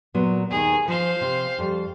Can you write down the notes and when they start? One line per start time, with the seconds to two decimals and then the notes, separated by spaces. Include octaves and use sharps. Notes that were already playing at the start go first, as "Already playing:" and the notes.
0.14 A#2 F#3 B3
0.50 D#2 D#3 G#4
0.88 F3 C5 F5
1.21 C3
1.58 F2 G3